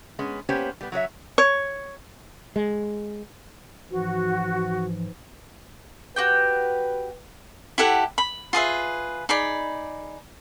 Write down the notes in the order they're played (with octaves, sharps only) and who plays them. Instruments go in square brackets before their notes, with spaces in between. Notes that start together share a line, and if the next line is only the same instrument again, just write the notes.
[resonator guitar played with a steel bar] G#3 B3 C#4
A#3 B3 C#4 G4 C5 C#5
G3 B3
F#3 F#4 C#5 E5
[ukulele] C#5
[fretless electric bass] G#3
[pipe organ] G#2 E3 F3 [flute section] F#4
[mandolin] F#4 G4 G5 [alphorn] B4
[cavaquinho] E4 G4 A4 F#5
B5
F4 G#4 B4 E5
D#4 G#4 D5 B5